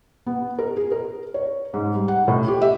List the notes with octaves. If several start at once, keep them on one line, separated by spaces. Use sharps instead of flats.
B3
A#4
G#4
A#4
C#5
G#2
G3
F#5
A2
G4
E5